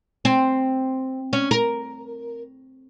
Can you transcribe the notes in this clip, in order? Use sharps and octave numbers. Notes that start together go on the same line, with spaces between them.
C4
C#4
A#4